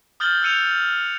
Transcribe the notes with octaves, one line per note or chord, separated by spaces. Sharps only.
D#6 F6 G6 A6 F#7 G7
E6 F#6 G6 C#7 D#7 F7